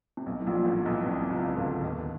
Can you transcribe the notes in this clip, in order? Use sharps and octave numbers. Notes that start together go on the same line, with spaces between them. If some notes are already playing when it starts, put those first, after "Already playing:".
C3
B1 B2
A2
A#1 A#2
A1 A2
B1 B2
C2 C3
C#2 C#3
D2 D3
D#2 D#3